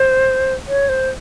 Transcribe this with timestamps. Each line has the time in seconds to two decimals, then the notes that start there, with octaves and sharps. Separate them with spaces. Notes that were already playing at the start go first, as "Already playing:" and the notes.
Already playing: C5
0.68 C#5
0.89 C5